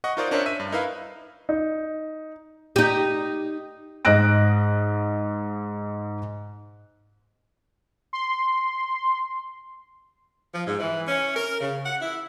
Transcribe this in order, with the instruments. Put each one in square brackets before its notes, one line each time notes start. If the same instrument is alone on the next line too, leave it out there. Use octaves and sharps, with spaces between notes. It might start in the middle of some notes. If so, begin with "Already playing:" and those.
[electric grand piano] D#5 F#5 C#6
D#4 F4 A#4 C5 D5 D#5
C#4 D4 A#4 C5 C#5 E5
E5 D#7
G2
D#4 E4 A#4 B4 E5 F5
[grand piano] D#4
[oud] D#4 G4
[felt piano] G#2 D#5 F#6 A#6 D7
[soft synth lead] C6
[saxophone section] F3
G#2
E3
C#4
A#4
C#3
F#5
E4